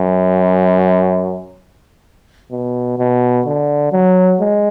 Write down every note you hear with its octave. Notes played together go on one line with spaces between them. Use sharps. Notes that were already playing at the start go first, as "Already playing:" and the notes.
Already playing: F#2
B2
B2
D3
F#3
G#3